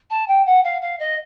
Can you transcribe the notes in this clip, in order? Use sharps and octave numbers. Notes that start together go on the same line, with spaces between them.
A5
G5
F#5
F5
F5
D#5